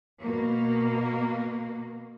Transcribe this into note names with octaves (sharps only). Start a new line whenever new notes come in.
B2 A#3